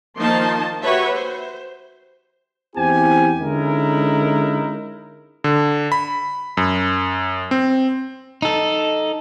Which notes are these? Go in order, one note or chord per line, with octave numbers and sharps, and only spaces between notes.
D#3 F3 A#3 D#4 A5 C6
F#4 G4 B4 C#5 E5
C5
E2 C4 E4 G4 G#5
D3 G#3 C#4 D#4 E4 A#4
D3
B5
F#2
C4
D#4 A4